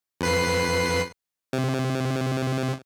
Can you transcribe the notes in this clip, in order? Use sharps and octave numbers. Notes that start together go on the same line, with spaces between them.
F2 B4 C7
C3